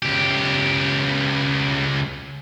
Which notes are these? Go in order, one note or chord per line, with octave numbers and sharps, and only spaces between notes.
C#2 G4